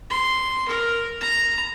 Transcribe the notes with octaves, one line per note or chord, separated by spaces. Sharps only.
C6
A#4
A#5